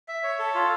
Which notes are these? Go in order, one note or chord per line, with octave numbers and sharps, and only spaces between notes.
E5
C#5
A4
F4